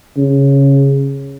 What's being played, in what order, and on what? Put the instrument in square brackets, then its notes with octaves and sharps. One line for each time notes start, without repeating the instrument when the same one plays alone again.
[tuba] C#3